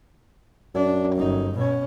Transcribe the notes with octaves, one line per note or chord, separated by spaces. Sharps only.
F#2 D4
G1 D#4
B2 C#4